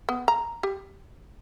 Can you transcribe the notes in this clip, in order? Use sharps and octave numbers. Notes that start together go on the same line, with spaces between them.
B3
A#5
G4